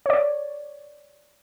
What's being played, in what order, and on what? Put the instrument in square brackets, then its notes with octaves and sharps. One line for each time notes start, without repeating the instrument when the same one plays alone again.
[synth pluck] C#5 D5